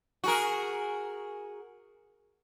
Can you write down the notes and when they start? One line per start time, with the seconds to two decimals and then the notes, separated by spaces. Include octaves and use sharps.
0.24 F#4 G#4 A#4